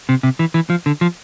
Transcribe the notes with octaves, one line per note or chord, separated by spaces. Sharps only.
C3
C3
E3
E3
F3
D3
F3